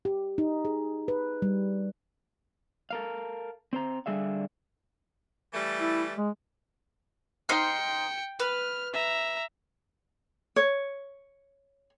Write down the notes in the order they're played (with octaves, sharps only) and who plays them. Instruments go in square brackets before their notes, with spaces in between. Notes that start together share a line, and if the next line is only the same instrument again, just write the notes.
[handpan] G4
D#4
G#4
B4
G3
[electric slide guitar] A4 A#4 F5
C4 C5 A#5
D3 G3 G#4 E5 F5
[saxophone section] E3 G3 A3
[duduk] E4
G#3
[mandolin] D#4 C5 F6 [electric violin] G5 C#7
[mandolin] B4 [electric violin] F6
[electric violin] E5 A#5
[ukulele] C#5